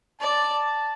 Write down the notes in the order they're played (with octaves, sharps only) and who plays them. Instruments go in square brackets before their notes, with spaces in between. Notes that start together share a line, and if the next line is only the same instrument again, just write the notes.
[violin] D5 [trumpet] A5